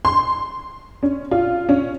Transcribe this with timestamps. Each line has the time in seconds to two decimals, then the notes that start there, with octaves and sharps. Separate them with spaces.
0.05 C6
1.03 C#4
1.31 F4
1.69 C#4